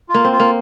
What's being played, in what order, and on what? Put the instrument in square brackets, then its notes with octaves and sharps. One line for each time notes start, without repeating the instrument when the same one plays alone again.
[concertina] F4
[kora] A#3
C4
[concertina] F4
[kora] A#3